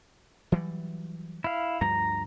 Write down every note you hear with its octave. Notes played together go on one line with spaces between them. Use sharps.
E3 F#3 G3
E4 F5
D2 G2 F3 A#5